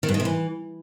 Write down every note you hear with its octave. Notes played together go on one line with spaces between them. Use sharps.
D#3
G2
D#3
C3
E3